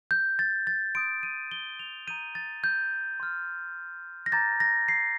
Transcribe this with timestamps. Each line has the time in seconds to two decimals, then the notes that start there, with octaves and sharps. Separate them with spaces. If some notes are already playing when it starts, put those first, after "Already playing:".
0.11 G6
0.39 A6
0.67 A6
0.95 C6 D#6 G6 D7
1.23 D#7
1.51 G7
1.79 F7
2.07 A#5 D#6 G6 D#7
2.35 A6
2.64 G6
3.20 C6 F6
4.26 A#6
4.32 A#5 D6 G6 A6
4.60 A#6
4.88 C7